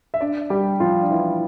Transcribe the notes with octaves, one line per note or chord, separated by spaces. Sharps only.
E5
D4 D5
G3 G4
F3 F4
D4
E3 E4